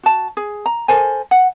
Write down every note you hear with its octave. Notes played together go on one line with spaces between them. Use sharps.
F#4 A5
G#4
A#5
A4 A#4 C5 G#5
F#5